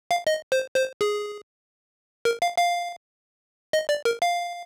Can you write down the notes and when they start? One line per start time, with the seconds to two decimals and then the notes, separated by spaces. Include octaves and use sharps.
0.11 F5
0.27 D#5
0.52 C5
0.76 C5
1.01 G#4
2.25 A#4
2.42 F5
2.57 F5
3.73 D#5
3.89 D5
4.05 A#4
4.22 F5